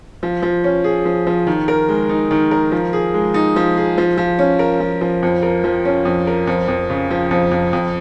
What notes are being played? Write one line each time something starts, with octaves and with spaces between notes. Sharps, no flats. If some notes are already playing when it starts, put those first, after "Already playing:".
F3
F3
C#4
G#4
F3
F3
D#3
A#4
G#3
D#4
D#3
A#4
F3
G#4
G#3
D#4
F3
G#4
F3
F3
C#4
A#4
F3
F3
F2
A#4
F3
C#4
F2
A#4
F2
F2
C#3
F3
F2
F2
F2